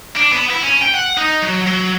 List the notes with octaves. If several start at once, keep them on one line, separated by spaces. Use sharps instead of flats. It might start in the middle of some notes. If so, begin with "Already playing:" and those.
D4
B3
E4
C#4
G5
F#5
D#4
F#3
F#3